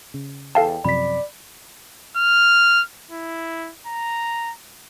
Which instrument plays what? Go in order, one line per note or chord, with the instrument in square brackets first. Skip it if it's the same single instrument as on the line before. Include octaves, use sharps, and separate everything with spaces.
[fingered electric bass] C#3
[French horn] E2 [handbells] A4 F5 A5 [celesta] G5
[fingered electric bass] F#2 C3 F3 [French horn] D5 [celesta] B5 B6
[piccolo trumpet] F6
E4
A#5